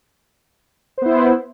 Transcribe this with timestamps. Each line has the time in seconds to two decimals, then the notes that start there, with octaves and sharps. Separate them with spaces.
0.98 C5
1.02 B3
1.06 E4